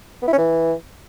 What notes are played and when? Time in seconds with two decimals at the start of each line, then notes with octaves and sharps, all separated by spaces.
0.22 B3
0.28 E4
0.33 C#4
0.38 E3